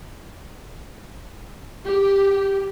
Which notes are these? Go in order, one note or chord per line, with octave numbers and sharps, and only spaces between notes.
G4